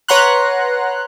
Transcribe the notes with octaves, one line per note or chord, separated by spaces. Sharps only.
B4 C#5 F#5 A#5 C6 F#6